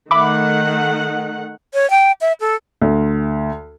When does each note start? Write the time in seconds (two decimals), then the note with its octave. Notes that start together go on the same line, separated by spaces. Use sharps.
0.11 D#3 A3 E5 F#5 B5 D6
1.74 C#5
1.90 G5
2.21 E5
2.40 A4
2.82 D2